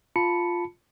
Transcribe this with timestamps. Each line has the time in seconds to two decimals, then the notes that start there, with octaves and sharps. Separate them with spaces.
0.16 F4 A5 B5 C#7